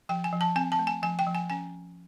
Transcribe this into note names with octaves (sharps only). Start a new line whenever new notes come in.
F3 G5
G#5
F3
A5
C4 G#5
A5
A3
G#5
F3 G#5
G5
F3
G#5
C#4 G#5